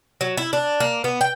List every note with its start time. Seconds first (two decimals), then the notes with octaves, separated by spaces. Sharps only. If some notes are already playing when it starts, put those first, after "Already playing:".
0.21 F#3
0.37 E4
0.53 D4
0.80 A#3
1.04 B3
1.21 G5